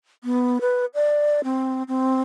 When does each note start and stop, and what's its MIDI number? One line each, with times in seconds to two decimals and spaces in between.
0.24 0.61 59
0.61 0.86 71
0.94 1.41 74
1.44 1.83 60
1.88 2.21 60